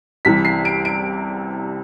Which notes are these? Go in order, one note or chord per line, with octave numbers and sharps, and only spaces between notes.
C2 C3 E3 B6
C7
D7
D7